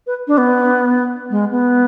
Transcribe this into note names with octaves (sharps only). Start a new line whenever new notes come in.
B4
D4
B3
G#3
B3